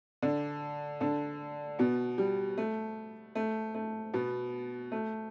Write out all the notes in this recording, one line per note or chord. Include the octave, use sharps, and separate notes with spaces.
D3 D4
D3 D4
B2 B3
G3
A3
A3
A3
B2 B3
A3